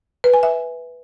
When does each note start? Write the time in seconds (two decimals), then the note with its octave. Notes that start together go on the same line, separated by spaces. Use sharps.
0.24 B4
0.33 G#5
0.43 E5